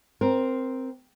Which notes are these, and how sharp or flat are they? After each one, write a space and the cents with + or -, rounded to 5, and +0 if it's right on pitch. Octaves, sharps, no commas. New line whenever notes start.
C4 +0 A#4 +15